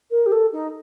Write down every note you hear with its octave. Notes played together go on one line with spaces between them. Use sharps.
A#4
G4
A4
D#4